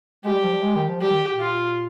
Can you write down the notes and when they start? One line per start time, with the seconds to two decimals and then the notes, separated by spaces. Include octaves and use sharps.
0.24 G#3 G4
0.33 G3
0.43 F3
0.53 G3
0.63 G#3
0.76 D#3
0.88 F3
1.01 G3 G4
1.10 D#3
1.29 A#2
1.40 F4